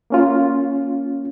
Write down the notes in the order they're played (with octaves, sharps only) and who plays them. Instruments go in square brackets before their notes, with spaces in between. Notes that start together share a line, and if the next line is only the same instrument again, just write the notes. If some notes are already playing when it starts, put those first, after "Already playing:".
[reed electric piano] A#3 C#4 F4